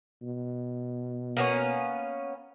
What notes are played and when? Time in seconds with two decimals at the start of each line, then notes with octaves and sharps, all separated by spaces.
0.23 B2
1.37 A#3 B3 C#4